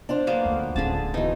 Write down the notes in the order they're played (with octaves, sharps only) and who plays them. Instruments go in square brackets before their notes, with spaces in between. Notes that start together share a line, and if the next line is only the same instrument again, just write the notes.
[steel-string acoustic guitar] D4 F4 C5
[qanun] F#3 A#3 B3
[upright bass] D2
[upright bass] D1 C#4 [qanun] D3 G#4 A5
[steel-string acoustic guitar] B2 E3 [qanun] D#4